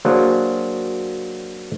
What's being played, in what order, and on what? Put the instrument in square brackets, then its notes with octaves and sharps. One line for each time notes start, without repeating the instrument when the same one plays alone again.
[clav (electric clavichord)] F#3 A#3 D4 G#4 C5